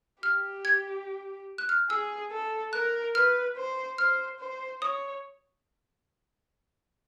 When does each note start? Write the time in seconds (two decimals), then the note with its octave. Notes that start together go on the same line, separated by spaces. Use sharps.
0.23 G4 F6
0.65 G#6
1.58 F#6
1.69 F6
1.90 G#4 E6
2.31 A4
2.73 A#4 F#6
3.15 B4 F6
3.57 C5
3.98 C5 F6
4.40 C5
4.82 C#5 D#6